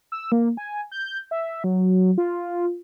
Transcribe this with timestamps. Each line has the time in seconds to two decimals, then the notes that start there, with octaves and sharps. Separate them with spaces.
0.12 E6
0.32 A#3
0.57 G#5
0.92 G6
1.31 E5
1.64 F#3
2.18 F4